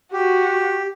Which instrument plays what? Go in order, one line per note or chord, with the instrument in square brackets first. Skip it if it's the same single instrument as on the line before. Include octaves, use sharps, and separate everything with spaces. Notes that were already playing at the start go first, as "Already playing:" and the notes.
[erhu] F#4 [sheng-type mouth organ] G4